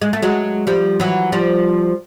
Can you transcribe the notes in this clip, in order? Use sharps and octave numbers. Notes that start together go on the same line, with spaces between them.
G#3
A3
F#3 G#3
F3 G3
E3 F#3
F3 G3